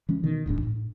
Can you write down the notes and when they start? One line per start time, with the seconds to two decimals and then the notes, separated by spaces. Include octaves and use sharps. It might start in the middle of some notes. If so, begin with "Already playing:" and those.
0.09 E3 G#3 C#4
0.23 B2 D#3
0.46 D1 A1 G#2 D4
0.63 A2